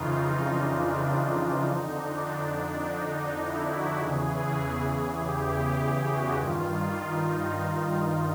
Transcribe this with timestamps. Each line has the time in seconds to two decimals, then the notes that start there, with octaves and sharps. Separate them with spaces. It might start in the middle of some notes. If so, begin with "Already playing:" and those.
Already playing: F2 C#3 E3 D#4 F4
0.46 D4
1.64 F2 D3 D#4
1.94 D4
2.23 D4
2.83 D#4
3.41 E4
3.70 F#4
4.00 E2 C#3 E3 G#4
5.18 G4
5.78 G4
6.06 F#4
6.36 G2 D#3 F4
6.95 D#4